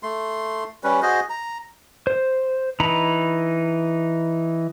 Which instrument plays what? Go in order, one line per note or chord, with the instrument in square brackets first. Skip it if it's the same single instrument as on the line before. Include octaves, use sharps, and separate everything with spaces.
[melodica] A3 C6
G3 C#4 B4
F#4 G#4 C5 D#5
A#5
[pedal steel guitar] C5
E3 D#4 A#5 B5